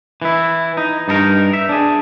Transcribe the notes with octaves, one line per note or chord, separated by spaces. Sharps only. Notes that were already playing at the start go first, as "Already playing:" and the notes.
E3 E4
D#4
G2 D#4 A4 A#4
E5
D4 G#4